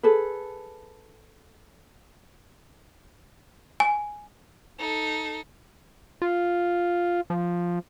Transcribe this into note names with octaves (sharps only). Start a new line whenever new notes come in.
G#4 A4 B4
G#5
D#4 A4
F4
F3